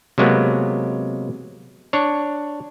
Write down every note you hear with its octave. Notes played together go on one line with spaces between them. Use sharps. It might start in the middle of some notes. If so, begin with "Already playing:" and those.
C3 F#3 G#3 A#3 B3
D4 C#5